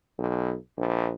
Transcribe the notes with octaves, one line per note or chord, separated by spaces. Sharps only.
B1
A#1